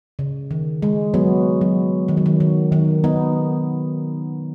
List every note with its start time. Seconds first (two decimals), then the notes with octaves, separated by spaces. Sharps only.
0.19 C#3
0.51 D#3
0.82 G#3
1.14 F#3 B3
1.61 F#3
2.08 D#3
2.17 F#3
2.26 D#3
2.40 D#3
2.72 D#3
3.04 B3 D#4